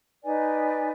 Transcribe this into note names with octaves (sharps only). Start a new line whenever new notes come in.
D#4 B4 D5 G#5